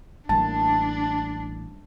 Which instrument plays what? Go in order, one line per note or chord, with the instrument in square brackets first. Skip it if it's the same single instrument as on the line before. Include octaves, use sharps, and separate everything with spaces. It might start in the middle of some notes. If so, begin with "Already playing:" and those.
[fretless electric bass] A1 A#3 [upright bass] G3 [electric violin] D4 [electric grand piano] A5